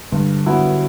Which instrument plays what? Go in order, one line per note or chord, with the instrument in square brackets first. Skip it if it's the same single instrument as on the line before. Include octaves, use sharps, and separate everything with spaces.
[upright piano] G2 [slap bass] D3
[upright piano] F#3 B3 E4